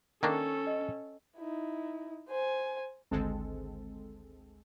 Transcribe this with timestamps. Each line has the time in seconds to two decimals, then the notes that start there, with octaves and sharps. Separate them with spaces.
0.23 D#3 A#3 C#4 D4 A4 G5 C#6
0.67 D#5
1.37 D#4 E4
2.29 C5 G#5
3.11 G#1 D2 G#3 C4 A4